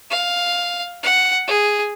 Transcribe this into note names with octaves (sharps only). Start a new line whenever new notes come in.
F5
F#5
G#4